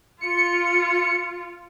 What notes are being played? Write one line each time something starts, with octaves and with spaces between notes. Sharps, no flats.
F4 C#7